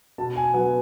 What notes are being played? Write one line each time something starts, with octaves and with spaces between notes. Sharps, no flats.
B2 A5
G#5
F#3 B3 F#5